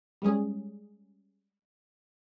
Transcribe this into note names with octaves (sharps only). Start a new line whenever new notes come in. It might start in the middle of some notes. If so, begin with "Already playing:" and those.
G3 G#3 C#4 G#4